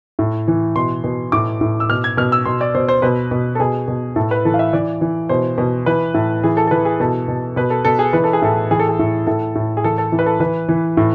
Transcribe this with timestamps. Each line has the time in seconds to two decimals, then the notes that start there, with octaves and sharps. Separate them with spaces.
0.19 A2
0.48 E3
0.76 B2 C6
1.04 B2
1.32 A2 D6
1.61 A2
1.80 E6
1.89 B2 F6
2.04 G#6
2.17 B2 F6
2.32 E6
2.45 B2 C6
2.61 D5
2.75 B2 C5
2.88 C5
3.02 B2 B4
3.31 B2
3.55 A4
3.60 B2 G#4
3.88 B2
4.16 A2 A4
4.31 B4
4.45 E3 A4
4.54 F5
4.59 E5
4.73 E3 D5
5.01 E3
5.29 B2 C5
5.58 B2
5.86 E3 B4
6.14 A2
6.44 E3 G#4
6.57 A4
6.67 A4
6.71 E3 B4
6.85 G#4
7.00 B2 A4
7.28 B2
7.56 B2 B4
7.70 A4
7.85 B2 A4
7.99 G#4
8.13 E3 B4
8.24 A4
8.33 G#4
8.42 A2 A4
8.71 E3 G#4
8.79 A4
8.88 G#4
8.99 A2
9.27 A2 A4
9.55 A2
9.77 G#4
9.84 E3 A4
9.98 A4
10.12 E3
10.19 B4
10.26 A4
10.40 E3 B4
10.69 E3
10.97 A2